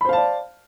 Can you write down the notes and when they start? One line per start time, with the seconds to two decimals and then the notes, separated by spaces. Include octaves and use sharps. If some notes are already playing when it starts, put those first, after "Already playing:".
0.01 B5
0.05 C5
0.09 F5
0.13 A5
0.17 D5